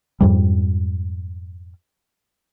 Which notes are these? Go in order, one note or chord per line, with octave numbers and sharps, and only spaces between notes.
F2 G#2 G3